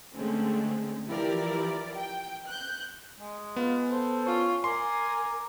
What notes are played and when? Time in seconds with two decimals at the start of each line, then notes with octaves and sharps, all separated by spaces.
0.15 D3 G#3 A3 C4 C#4
1.06 E3 F3 E4 G4 A#4 D5
1.96 G5
2.47 F#6 G6
3.20 G#3
3.56 B3 F4
3.90 A4 C5
4.26 C#4 F4
4.64 A#4 D5 G#5 C6